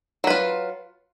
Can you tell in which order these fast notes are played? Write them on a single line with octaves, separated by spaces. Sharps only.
F#3 B4 F4